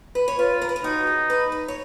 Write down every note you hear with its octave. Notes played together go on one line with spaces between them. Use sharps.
B4
C#5
F4 B4
A#4
B4
A#4
D#4 F#4
G#4
B4
B4
C#5